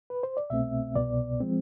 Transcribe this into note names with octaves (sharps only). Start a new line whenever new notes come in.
B4
C5
D5
C2 B2 A3 C4 E5
C2 B2 B3 D5
F3 G#3 C4